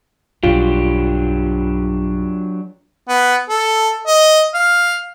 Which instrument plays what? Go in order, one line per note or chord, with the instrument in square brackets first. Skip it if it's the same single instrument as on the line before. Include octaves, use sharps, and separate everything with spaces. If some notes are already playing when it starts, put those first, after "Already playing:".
[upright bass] B1 G2 [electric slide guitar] F#3 D4 G4 [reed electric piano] F4
[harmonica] B3
A4
D#5
F5